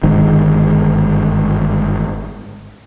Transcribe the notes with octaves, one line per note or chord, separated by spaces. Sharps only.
G1 G#2 D#3